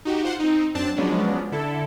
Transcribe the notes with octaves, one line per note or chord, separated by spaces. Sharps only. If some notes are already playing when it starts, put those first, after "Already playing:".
D#4 F#4 G4
F4 C5 F#5
C4 D#4
F#2 C4 D4 A5
F3 F#3 G#3 B3 C#4 D4
D3 E4 A4